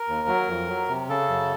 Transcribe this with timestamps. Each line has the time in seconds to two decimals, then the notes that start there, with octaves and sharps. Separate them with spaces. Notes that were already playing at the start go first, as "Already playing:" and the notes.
Already playing: A#4
0.08 D#2
0.28 F#3
0.48 F2
0.69 F#3
0.89 C3
1.09 C#3 A4
1.29 F#2